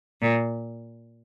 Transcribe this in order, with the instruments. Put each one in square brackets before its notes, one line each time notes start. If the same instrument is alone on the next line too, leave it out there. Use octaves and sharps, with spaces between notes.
[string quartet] A#2